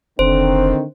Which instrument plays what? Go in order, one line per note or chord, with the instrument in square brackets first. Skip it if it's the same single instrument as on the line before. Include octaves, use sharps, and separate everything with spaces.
[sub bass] F1 [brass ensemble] D3 D#3 C4 [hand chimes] C5